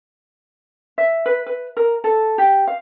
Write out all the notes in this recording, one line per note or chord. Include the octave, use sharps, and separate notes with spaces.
E5
B4
B4
A#4
A4
G4
F5